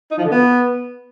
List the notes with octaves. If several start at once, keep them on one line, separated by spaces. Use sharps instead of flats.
D#4
F3
D3
B3